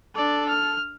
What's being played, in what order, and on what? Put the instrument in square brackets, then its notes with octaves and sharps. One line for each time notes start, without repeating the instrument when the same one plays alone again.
[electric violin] D4 D5 [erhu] A4
[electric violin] F6